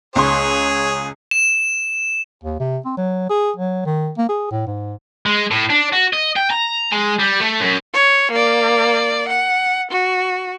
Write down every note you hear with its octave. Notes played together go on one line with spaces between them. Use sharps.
C#2 G#4 C#5 C6
E7
D#2
C3
C4
F#3
G#4
F#3
D#3
A#3
G#4
A2
G#2
G#3
A2
D4
F#4
D#5
G5
A#5
G#3
G3
A3
F#2
C#5
A#3 D5
F#5
F#4